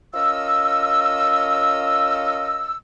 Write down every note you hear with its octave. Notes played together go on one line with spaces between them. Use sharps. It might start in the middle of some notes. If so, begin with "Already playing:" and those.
C#4 F4 A#4 D#5 E6